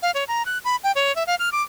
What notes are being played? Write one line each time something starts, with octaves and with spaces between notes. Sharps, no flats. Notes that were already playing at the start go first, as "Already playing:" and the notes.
F5
C#5
A#5
F#6
B5
G5
C#5
E5
F5
F6
D6